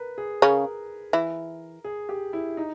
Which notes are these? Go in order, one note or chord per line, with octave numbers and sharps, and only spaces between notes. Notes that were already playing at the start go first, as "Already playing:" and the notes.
Already playing: A#4 B4
G#4
C#3 C#4 A#4
E3 E4
G#4
G4
E4
D#4